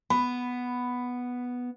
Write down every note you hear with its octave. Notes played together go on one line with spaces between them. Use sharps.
B3 B5